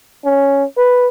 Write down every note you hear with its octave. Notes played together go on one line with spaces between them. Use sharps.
C#4
B4